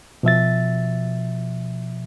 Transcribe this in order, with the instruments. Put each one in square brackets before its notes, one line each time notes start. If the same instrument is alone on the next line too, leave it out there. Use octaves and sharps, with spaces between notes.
[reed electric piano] B2 F3 E5 A6